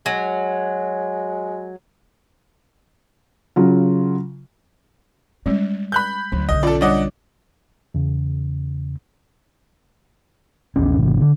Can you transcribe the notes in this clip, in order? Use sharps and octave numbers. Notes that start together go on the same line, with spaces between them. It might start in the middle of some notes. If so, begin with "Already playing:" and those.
F#3 G#3
C#3 F#3 F4
G3 G#3 C#4 D#4
B5 F#6 G6
D2 F#3
B1 D3 D#5
C#4 F4 A4 D5
G3 D4 C#5 D#5 F#5 D6
E2 C#3
A#1 E2 C#4
G#1 C3 E3
D3